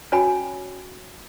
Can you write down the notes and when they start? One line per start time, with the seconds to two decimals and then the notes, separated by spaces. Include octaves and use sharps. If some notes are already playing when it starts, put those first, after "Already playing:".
0.12 C#4 F#4 C#5 G5 G#5 B5